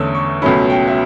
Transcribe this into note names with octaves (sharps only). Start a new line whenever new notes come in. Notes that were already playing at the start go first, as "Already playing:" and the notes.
Already playing: E2 D3 A3 C#4 E6
C#6
C#2 B2 F#3 A3 C#4 B5
G5
E5